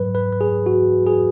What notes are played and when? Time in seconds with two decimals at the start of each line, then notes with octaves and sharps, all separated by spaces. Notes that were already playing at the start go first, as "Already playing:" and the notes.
Already playing: G#2 F#3 B4
0.15 B4
0.33 B4
0.41 G#4
0.66 F#4
1.06 G#4